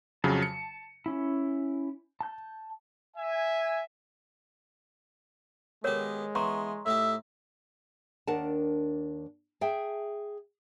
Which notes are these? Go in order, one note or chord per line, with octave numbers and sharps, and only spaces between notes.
F2 C#3 F#3 A5
C#7
C#4 E4
A5 G6
E5 G#5
D#3 G#3 B3 G4 A4 A#4 C#5
E3 B3 A#5 C6 C#6
A2 D#4 G4 E5
D#2 D4 A#4 F#5 A5
G#4 E5 G5 A5